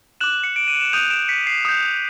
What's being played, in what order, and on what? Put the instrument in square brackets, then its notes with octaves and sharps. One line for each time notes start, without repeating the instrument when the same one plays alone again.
[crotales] D6 F#6 E7 F#7
C#7
D7
D#7
E7
D#6 G6 D#7 F7
D7 E7
B6 C#7
C7
D#6 G6